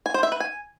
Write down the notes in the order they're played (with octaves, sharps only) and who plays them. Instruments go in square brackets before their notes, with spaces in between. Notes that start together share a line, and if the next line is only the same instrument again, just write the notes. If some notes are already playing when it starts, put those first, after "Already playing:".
[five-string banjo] G#5
C5
E5
B4
G#5